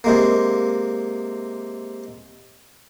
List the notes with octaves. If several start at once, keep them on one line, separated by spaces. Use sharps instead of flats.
C3 G#3 A#3